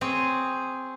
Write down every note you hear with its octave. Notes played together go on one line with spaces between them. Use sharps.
C4 G#4 C#5